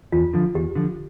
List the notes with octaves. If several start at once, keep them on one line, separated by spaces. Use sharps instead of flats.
E2 F4
D3 F3
E2 G4
D3 F3